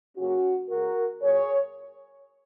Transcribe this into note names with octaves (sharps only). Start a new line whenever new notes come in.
C#3 F#3 A#3 C#4 F#4
C#3 G#3 F#4 A#4
A#2 F#3 A#3 G#4 C#5